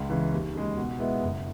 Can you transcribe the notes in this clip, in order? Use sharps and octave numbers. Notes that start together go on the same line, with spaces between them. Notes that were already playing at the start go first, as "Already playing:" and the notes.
Already playing: C#2
C#3 E3
D#2
C#3 G#3
B2
G#3 B3 E4
F#1